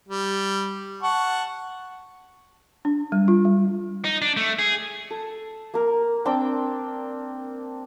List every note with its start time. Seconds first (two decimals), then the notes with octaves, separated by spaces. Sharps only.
0.08 G3
1.02 F#5 A5 C#6
2.85 D4
3.12 G3
3.28 F4
3.45 G3
4.05 D#4
4.22 D4
4.37 A3
4.59 G#4
5.11 A4
5.74 A#3 A#4
6.25 C4 D4 G5 D6